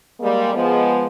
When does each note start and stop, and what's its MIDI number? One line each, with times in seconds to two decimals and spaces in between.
0.20 0.53 55
0.20 0.53 56
0.20 0.53 58
0.54 1.07 53
0.54 1.07 56
0.54 1.07 59